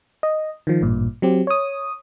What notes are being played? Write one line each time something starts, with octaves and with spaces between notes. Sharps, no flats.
D#5
D#3 F3
A1 G2 A#2
F#3 C4 G4
C#5 D#6